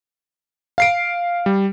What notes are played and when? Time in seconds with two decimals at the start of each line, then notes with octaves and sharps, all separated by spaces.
0.78 F5 C7 D7
1.46 G3